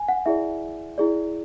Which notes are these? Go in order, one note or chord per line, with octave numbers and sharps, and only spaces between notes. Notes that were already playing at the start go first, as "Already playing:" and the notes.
Already playing: G#5
F#5
E4 G#4 D5 E5
E4 G#4 D5